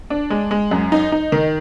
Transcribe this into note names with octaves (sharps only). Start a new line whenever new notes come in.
D4
G#3
G#3
F#2
D#4
D#4
D#3